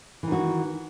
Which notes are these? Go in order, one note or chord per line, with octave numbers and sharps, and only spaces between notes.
D#3 E3 F#4